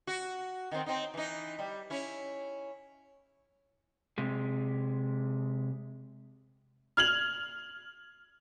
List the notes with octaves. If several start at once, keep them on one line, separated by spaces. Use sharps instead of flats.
F#4
D#3 C4
C4 D#4
E3 D#4
G3
C#4 E4
C3 G#3
F6 G#6 F7 F#7